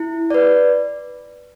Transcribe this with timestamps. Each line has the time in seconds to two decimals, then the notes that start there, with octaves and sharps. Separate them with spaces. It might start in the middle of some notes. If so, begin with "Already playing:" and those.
Already playing: E4
0.30 B4 D5